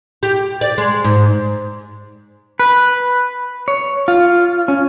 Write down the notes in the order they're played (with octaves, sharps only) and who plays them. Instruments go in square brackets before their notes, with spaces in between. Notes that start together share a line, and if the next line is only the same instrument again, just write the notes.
[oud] G4
D5
G#3
G#2
[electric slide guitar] B4
C#5
F4
C#4